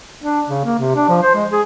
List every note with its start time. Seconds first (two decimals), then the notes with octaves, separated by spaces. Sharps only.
0.24 D4
0.47 C#3
0.65 A#3
0.78 C3
0.96 D4
1.09 F3
1.22 C5
1.35 G#3
1.52 G#4